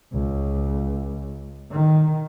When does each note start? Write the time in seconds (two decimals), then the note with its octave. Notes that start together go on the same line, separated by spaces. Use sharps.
0.13 C#2
1.71 D#3